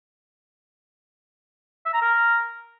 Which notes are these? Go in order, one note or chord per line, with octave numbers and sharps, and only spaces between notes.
E5
A#5
A#4